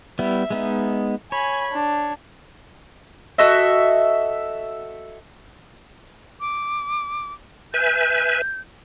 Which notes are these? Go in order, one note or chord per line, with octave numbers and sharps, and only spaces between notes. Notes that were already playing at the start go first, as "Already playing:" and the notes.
G3 B3 E4 E5
G#3 B3 D#4
C#5 G#5 B5
D4
F#4 A4 D#5 E5
D6
B4 E5 G#5 G6